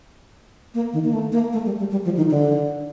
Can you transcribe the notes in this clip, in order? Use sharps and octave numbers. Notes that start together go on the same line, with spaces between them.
A#3
D#3
A#3
A3
A#3
A3
G3
G3
G3
F3
D#3
D3